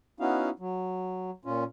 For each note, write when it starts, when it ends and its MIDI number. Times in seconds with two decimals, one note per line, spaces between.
0.20 0.50 59
0.20 0.50 61
0.20 0.50 63
0.20 0.50 64
0.20 0.50 66
0.20 0.50 77
0.59 1.31 54
1.45 1.64 46
1.45 1.64 61
1.45 1.64 65